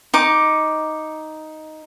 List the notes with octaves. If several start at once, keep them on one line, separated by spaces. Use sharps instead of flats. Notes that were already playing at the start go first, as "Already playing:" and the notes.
D#4 D6